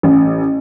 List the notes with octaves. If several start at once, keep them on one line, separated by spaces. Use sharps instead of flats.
A1